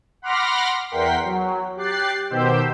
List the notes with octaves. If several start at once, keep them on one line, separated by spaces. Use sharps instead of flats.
F#5 B5 C6 D6 F6 A#6
E2 A#4 F#5 G5 C6 B6
F#3
G4 G5 F#6 A6 C7
B2 D#3 G4 C5 E6 G6